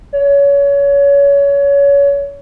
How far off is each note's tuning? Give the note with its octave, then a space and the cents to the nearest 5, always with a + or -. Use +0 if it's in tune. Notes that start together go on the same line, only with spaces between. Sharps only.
C#5 +25